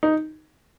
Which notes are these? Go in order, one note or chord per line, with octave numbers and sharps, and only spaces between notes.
D#4